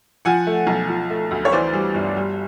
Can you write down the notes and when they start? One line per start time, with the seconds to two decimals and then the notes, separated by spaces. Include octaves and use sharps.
0.25 F3 F#5 G#5
0.47 A3
0.67 B1
0.88 F3
1.10 A3
1.31 D2
1.45 C#5
1.52 E3 C5 D5
1.73 G3
1.94 G1
2.16 G3